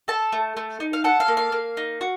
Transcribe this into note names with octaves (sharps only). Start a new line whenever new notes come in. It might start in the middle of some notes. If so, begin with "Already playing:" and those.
A4 A5
A3
A3
D#4
F5
A4 F#5
F5
A#3
F5
A#3
D#4
F#4